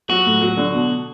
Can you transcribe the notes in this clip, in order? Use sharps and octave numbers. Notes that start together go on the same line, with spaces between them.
F#3 F#4
A2
F#3
D3
B2